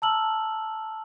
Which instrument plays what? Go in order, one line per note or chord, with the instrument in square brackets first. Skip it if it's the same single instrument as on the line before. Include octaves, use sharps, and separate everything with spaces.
[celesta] A5 A#5 E6 F6 F#7